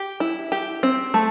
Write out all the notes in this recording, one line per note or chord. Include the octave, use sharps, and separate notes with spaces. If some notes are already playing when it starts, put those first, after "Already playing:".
Already playing: G4
E4
G4
C4
A3